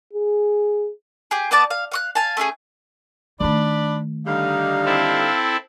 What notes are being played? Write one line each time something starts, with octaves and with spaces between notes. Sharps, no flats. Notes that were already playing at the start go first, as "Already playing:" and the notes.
G#4
G4 G#4
B3 D5 A5 D6
F5
F5 C#6 F#6
F5 G#5 A5
A3 C#4 D4 G#4
D#3 A3 D4 D5 B5
D3 G3 D#4 F5
C4 E4 A4